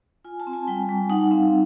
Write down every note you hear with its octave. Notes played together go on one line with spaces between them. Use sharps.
F4 G#5
A5
C4
G#5
G3 G5
G3
D#4 F#5
C4 F5